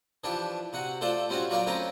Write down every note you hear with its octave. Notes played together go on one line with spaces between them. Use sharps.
E3 F3 D4 G4
C3 F#4 F#5
A3 F4 A4 C5 D5
G3 C4 C#4 F4 F#4
F#3 F4 A#4 D5 F5 G5
D2 C4 C#4 B4 G5 A#5